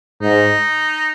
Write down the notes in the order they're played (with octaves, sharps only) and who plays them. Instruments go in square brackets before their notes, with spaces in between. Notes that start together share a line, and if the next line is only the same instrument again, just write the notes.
[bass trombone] G#2 [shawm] D#4